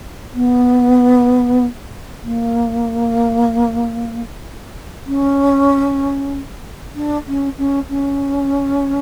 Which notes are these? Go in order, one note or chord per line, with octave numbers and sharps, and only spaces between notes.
B3
A#3
C#4
D4
C#4
C#4
C#4